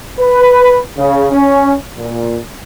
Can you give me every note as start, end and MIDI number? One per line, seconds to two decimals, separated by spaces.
0.18 0.78 71
0.97 1.29 49
1.32 1.72 61
1.97 2.38 46